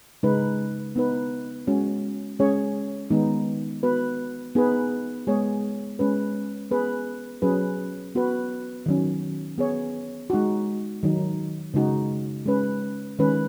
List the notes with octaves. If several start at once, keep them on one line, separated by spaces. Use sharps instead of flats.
C#3 G#3 D#4 B4
B3 D#4 B4
G#3 C#4 F#4
G#3 C#4 G#4 C#5
D#3 G#3 B3 D#4
B3 F#4 B4
B3 D#4 G#4 B4
G#3 B3 G#4 C#5
G#3 C#4 B4
B3 G#4 B4
F#3 C#4 G#4 B4
B3 F#4 B4
D#3 F#3 C#4
B3 G#4 C#5
G#3 D#4 F#4
D#3 F#3 D#4
C#3 G#3 D#4 F#4
G#3 C#4 B4
D#3 G#3 C#4 B4